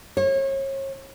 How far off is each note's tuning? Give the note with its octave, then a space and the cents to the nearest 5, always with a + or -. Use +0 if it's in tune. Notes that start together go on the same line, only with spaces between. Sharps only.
C#5 -35